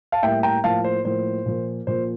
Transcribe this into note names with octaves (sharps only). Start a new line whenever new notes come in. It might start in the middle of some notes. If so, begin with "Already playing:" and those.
F5 A5
A2 G3 A#3 E5 G5
G5 A#5
A2 F3 A#3 F5 A5
C5
A2 F3 A#3 C5
A#2 F3 A#3
A#2 F3 A#3 C5